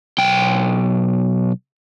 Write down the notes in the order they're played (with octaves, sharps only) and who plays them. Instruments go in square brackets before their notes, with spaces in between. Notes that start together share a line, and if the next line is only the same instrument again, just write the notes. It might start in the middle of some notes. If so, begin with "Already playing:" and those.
[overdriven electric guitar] B1 G5